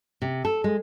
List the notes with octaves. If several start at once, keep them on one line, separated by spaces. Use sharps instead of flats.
C3
A4
G#3